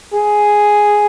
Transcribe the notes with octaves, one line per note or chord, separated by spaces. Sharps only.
G#4